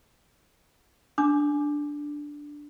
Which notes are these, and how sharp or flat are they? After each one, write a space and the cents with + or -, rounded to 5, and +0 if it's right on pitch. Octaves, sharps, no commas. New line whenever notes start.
D4 +0 D6 +10